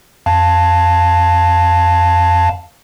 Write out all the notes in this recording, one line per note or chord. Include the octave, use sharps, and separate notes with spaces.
F2 F5 A5